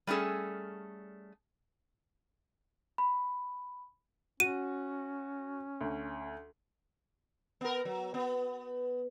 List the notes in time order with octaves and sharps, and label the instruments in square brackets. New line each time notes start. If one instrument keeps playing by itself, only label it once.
[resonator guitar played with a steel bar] G3 A3 C#4 G#4 A4
[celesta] B5
[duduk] C#4 [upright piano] F#4 [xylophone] D#7
[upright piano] D2
[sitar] B3 A#4
F#3
B3